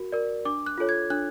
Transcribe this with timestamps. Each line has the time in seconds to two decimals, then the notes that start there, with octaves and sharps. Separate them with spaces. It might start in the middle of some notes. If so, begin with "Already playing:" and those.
Already playing: F#4 A#4
0.12 A#4 D5
0.45 D4 D6
0.66 F#6
0.78 F4 A4 C#5
0.89 G#6
1.10 D4 F#6